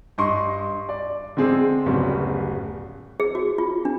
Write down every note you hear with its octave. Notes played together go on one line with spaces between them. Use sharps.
G2 D#5 C6 C#6
D5
D3 G#3 C4 G#4
D1 F#2 C#3 G3 B3
G#4
F#4
F4
D4